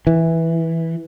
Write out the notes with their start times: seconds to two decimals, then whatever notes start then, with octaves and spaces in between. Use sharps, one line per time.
0.07 E3